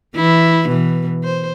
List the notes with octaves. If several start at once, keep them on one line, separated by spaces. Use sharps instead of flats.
E3 E4
B2 E3
C5